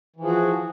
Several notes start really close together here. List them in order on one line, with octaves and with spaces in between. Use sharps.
E3 F3 G#4 F#4